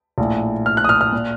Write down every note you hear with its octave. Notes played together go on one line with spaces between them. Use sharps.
A#1 A2
F6
F#6
D#6
F6
F6
A#2